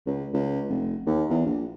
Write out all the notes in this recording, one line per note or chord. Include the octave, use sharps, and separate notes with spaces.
C#2
C#2
F1
D#2
E2
A#1